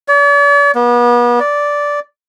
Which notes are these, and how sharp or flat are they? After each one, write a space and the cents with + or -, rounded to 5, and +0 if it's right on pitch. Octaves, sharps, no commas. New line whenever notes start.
D5 -45
B3 -40
D5 -10